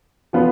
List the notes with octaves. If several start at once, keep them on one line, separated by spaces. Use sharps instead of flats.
F3 B3 F4 B4